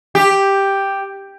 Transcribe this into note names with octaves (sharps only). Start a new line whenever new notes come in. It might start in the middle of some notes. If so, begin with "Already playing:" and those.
G4